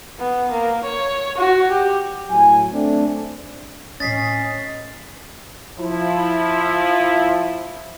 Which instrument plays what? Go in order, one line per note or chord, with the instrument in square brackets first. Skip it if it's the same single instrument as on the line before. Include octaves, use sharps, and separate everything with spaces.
[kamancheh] B3
A#3
C#5
F#4
G4
[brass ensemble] A2 F#3 G#5
A3 C4 D4
[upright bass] A2 C4 [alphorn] C#4 [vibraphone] D#5 D#6 [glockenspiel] A6 B6 C7
[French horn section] F3 E4